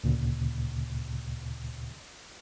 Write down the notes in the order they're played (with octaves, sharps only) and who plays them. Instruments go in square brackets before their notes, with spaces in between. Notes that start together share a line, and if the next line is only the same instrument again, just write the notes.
[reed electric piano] D2 A#2 C#3